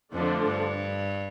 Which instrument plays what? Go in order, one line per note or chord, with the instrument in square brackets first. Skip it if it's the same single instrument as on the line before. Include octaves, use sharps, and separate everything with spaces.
[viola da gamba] F2 [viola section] D3 F3 A3 D4
[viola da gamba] G2